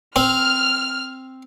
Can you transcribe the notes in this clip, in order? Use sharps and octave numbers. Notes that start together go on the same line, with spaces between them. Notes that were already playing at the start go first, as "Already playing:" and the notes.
C4 F6